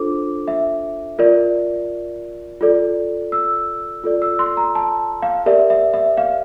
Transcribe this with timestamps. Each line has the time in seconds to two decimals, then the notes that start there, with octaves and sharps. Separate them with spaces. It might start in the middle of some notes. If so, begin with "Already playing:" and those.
Already playing: D4 F4 A4 C5 D6
0.48 E5
1.19 F4 A#4 D5
2.61 F4 A4 D5
3.32 E6
4.04 F4 A4 D5
4.22 E6
4.39 C6
4.57 A#5
4.75 A5
5.22 F5
5.46 G4 A#4 D5 E5
5.70 E5
5.94 E5
6.17 F5